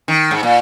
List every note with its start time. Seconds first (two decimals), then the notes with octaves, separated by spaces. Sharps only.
0.08 D#3
0.31 G#2
0.43 A#2